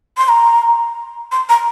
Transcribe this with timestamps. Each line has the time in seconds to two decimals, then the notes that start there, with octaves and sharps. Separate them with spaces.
0.18 C6
0.29 A#5
1.32 C6
1.49 A#5